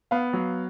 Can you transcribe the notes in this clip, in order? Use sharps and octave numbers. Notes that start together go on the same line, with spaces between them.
B3 F5
F#3